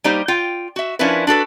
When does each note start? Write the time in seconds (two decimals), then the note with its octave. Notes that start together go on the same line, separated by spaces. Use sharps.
0.04 G3 A#3 D#4 G4 C5
0.28 F4 G5
0.76 F#4 E5
0.99 F3 C#4 D4 E4 A#4 B4
1.27 D4 F#4 A4 B4